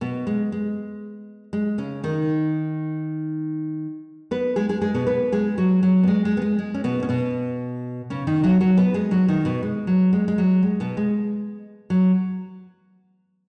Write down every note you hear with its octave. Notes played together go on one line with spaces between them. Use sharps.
B2 B3
G#3
G#3
G#3
C#3 C#4
D#3 D#4
B3 B4
G#3 G#4
G#3 G#4
G#3 G#4
B2 B3
B3 B4
G#3 G#4
F#3 F#4
F#3
B3
G#3
G#3
B3
G#3
G#3
C#4
B2 B3
C#4
B2 B3
C#3 C#4
D#3 D#4
F#3 F#4
F#3 F#4
B3 B4
G#3 G#4
F#3 F#4
D#3 D#4
B2 B3
G#3
F#3
G#3
G#3
F#3
G#3
B2 B3
G#3
F#3